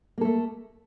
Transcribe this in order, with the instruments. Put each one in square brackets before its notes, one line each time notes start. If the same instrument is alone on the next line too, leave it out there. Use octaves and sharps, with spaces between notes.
[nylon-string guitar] A#3
A4
A3